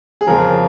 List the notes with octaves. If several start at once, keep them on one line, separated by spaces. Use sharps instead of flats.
G#4
F2 C#3 F3 A#4